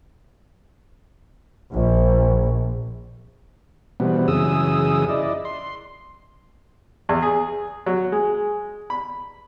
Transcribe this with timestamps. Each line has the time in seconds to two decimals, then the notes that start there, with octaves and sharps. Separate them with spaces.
1.71 A#1
4.00 B2 E3 G3 B3 C4
4.28 F#2 C#3 E3 G#4 D#6 E6
5.09 E4 D5 D#5
5.45 C6
7.09 E2
7.22 G#4
7.86 F#3
8.12 G#3
8.90 B5